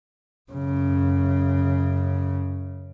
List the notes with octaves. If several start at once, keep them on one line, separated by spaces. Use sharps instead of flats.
F#2 C#3